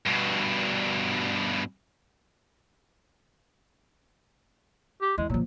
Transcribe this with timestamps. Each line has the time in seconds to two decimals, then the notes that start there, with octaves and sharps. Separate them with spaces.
0.06 G2 B2
5.02 G4
5.18 E2 G#3
5.30 A#2 F3 F#3